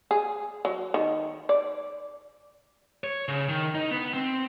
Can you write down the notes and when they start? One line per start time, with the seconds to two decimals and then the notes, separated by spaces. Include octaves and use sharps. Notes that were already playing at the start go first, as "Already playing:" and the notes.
0.11 G#4
0.65 F#3
0.94 D#3
1.49 D5
3.04 C#5
3.28 C#3
3.49 D#3
3.75 D#4
3.91 B3
4.14 C4